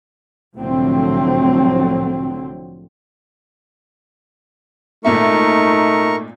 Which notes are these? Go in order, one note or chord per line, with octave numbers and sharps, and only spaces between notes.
C2 A2 D3 F3 F#3 C4
G#1 A#2 A3 D#4 A#4 E5 C#6